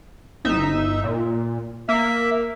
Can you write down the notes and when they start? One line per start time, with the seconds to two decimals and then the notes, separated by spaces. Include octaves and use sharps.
0.45 G1 D#4 E5
1.04 A#2
1.89 A#3 E5